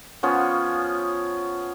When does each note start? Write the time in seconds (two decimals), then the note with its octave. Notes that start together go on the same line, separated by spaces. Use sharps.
0.23 F3 B3 C#4